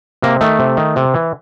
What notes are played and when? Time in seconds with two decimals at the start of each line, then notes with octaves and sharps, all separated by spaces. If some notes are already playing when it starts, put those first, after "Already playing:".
0.22 C3 A#3
0.41 D#3 A3
0.59 C3
0.77 D#3
0.96 C3
1.14 E3